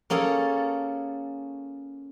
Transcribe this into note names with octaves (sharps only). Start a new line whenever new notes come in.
A#3 C#4 G#4 A4